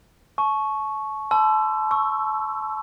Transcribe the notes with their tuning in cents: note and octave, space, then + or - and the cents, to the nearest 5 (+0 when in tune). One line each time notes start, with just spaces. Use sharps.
A5 -35 C#6 +0
A5 -30 C6 -35 E6 +20
C#6 +0 E6 +0